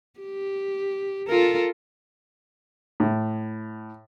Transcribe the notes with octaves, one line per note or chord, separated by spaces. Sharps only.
G4
F4 A4 A#4
A2